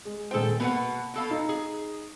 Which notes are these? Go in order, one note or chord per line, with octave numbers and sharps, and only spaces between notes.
G#3
D#1 G#4 A4 C5 G5
B2 A#3 B4 F#5
B2 A4 F5
D#4
G#4